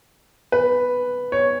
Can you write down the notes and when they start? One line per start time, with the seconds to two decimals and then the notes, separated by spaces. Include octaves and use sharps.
0.52 B4
1.32 C#5